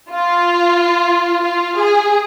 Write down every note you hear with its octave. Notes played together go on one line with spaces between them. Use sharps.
F4
F4
G#4